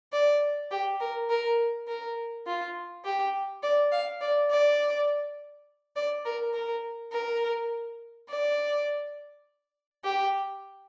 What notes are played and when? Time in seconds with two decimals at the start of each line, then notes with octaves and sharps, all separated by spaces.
0.12 D5
0.71 G4
1.00 A#4
1.30 A#4
1.87 A#4
2.46 F4
3.04 G4
3.63 D5
3.92 F5
4.21 D5
4.50 D5
5.96 D5
6.25 A#4
6.54 A#4
7.12 A#4
8.29 D5
10.04 G4